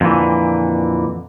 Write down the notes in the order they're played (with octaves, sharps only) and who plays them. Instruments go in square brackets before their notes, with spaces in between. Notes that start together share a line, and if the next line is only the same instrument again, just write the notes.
[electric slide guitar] F2 A#2 D3 E3